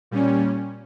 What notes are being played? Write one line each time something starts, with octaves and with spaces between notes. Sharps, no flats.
A#2 G3 C#4